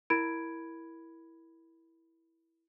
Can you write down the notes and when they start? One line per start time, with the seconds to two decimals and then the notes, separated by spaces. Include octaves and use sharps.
0.10 E4 A#4 B5 G#6 D7